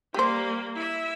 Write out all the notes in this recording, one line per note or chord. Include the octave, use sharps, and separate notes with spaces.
G3 A#3 G4 C5
E4 E5